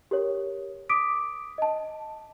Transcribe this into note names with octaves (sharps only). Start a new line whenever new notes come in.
G4 A#4 C#5
D6 D#6 B6 D7
D#5 A5